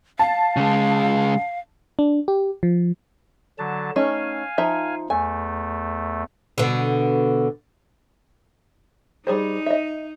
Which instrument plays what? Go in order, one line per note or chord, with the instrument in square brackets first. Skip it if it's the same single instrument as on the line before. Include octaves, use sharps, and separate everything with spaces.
[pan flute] F5 [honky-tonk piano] A5
[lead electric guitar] C#3 G#3
[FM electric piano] D4
G4
F3
[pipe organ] D3 F#3 A5
[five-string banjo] A3 C#4 D#4 [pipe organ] F5 G#5
[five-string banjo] F3 D#4 E5
[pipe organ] E2 A3 [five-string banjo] G#5
[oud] B2 D3
[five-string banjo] G3 G#4 C5 [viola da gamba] D#4
[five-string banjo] D#5 E5